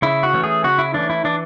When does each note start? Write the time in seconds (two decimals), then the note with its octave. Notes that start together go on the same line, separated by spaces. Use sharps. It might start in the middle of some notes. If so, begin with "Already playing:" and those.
0.02 C#3 E4
0.23 F#4
0.33 E3 A3 C#4
0.44 G#4
0.64 C#3 F#4
0.78 E4
0.94 E3 A3 C#4 D4
1.10 E4
1.24 E3 D4